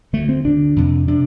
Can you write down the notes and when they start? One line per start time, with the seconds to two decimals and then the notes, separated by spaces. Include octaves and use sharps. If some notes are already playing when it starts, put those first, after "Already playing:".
0.13 D2 D3 A3
0.29 C4
0.45 D2 D3 D4
0.76 F2 C3
1.08 C3 D4